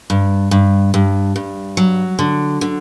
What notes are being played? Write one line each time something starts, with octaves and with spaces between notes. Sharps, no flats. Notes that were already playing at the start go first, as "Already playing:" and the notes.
G2
G2
G2
G2
F#3
D3
D3